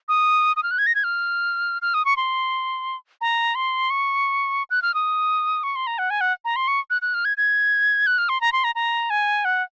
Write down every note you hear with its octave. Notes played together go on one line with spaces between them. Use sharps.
D#6
D#6
F6
F#6
G#6
A#6
G#6
F6
F6
D#6
C#6
C6
A#5
C6
C#6
F#6
F6
D#6
C#6
C6
A#5
F#5
G#5
F#5
A#5
C6
C#6
F#6
F#6
F6
G#6
G#6
F#6
F6
C6
A#5
C6
A#5
A#5
G#5
F#5